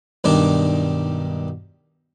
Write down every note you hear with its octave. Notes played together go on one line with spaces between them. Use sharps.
B1 G2 D#3 G3 D4 D5